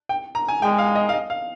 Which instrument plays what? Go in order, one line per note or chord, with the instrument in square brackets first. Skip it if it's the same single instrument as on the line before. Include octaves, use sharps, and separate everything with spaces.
[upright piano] G5
A#5
G#5
[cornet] G#3 [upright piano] G5
[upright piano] F5
D#5
F5
D#5
F5